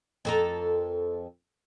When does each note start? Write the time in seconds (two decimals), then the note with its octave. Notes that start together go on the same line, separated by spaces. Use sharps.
0.25 F2 A4 A#4